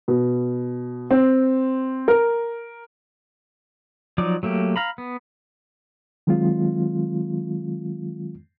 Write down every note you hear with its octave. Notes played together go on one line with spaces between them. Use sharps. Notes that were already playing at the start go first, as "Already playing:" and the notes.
B2
C4
A#4
F3 F#3 D#4 D5 D6
F#3 A3 A#3 G4
F5 A#5 B5
B3
D#3 F#3 G#3 C4 F4